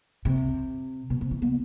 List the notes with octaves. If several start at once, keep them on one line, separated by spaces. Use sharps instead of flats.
C3
B2
C3
E3
B3